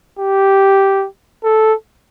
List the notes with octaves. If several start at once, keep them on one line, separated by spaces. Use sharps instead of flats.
G4
A4